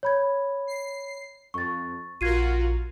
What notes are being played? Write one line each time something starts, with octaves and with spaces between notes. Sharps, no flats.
C#5 B5 G#6
C7
F2 C#6 A6
A#1 F4 F#4 A#4 G#6 C7 D#7